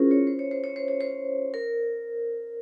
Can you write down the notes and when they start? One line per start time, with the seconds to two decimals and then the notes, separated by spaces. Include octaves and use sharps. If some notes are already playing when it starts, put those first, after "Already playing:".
Already playing: C#4 E4 F4 G#4 A#4 C5
0.11 C#5
0.27 C5
0.39 C#5
0.51 C5
0.64 C#5
0.76 C5
0.88 C#5
1.01 C5
1.54 A#4